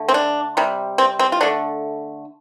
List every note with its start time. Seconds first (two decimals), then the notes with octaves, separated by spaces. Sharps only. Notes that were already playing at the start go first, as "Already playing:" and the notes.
Already playing: D3 A3
0.09 C4
0.14 D4
0.57 C3 G3
0.98 C4
1.19 C4
1.32 F4
1.41 D3 A3 D4